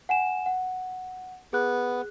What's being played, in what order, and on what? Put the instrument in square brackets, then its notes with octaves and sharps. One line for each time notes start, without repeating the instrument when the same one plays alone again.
[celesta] F#5 G#5 E7
F#5
[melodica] B3 [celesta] G#4 F#6